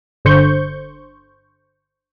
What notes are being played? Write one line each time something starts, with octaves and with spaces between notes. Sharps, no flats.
G1 D3 C5 C#6 G6